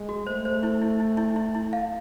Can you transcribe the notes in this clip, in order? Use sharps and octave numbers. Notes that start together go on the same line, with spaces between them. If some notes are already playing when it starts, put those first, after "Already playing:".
Already playing: G#3
F#4
A3 C5
C5
E4
E4
E4
E4
E4
E4
F5